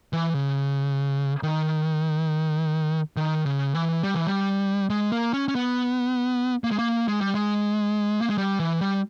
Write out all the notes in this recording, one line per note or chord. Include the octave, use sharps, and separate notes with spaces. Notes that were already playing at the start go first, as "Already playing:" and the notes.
E3
C#3
D#3
D#3
C#3
E3
G3
E3
G3
G#3
A#3
C#4
C#4
B3
A#3
G#3
A#3
G#3
G3
G#3
A#3
G#3
G3
E3
G3